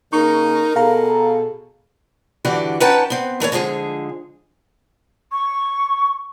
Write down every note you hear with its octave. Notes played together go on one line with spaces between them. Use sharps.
C#3 A#3 D#4 A#4 C#6
B2 G#4 A4 F5 A#5
G2 D3 E3 F#4 G4 D5
C#4 D#4 B4 F#5 G5 A5
B3 C4
E3 A3 B4 C#5
D3 F3 G#3 G#4
C#6